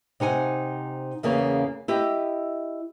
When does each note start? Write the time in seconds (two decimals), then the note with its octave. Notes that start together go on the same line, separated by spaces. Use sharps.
0.20 C3 D#4 F#5 G#5
1.23 E2 C#3 A#3 C#4
1.88 E4 G4 D#5